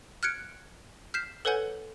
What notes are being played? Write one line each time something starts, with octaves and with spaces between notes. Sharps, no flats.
F6 F#6 G#6 C#7 D7
F6 G6 B6 C7 E7
A4 B4 C#5 F#5 G#5 G6